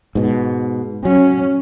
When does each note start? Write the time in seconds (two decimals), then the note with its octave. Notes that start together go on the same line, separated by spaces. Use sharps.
0.15 G#2 B2
1.05 F#3 C#4